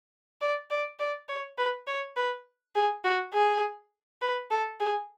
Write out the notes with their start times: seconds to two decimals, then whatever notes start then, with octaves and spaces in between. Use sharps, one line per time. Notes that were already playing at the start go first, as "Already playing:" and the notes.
0.41 D5
0.70 D5
0.99 D5
1.29 C#5
1.58 B4
1.87 C#5
2.16 B4
2.75 G#4
3.04 F#4
3.33 G#4
4.22 B4
4.51 A4
4.80 G#4